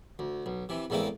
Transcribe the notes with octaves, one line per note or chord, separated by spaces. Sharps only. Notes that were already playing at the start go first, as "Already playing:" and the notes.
D2
B1
C3 E3
E2 A2 E3 G#3 A#3 C4